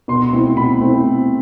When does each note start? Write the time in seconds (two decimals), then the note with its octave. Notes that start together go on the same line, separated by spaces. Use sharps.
0.08 B2 C6
0.32 A3 C4 E4
0.56 B2 B5
0.80 A3 C4 E4